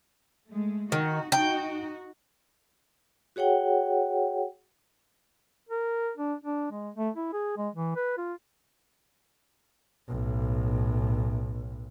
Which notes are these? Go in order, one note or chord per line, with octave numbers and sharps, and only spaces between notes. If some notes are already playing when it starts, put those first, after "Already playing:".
G#3 A3
D#3 D#4 F#4
D#4 F#4 G5
F#4 G#4 C#5 F#5 G5
A#4
D4
D4
G#3
A3
E4
G#4
G#3
E3
B4
F4
B1 A2